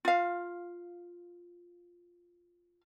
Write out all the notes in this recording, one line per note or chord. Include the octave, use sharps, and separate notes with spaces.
F4 F5